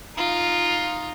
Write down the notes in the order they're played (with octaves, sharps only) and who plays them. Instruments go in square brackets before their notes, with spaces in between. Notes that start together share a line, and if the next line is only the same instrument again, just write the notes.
[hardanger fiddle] D#4 F4